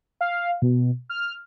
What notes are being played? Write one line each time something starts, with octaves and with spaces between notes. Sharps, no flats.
F5
B2
F6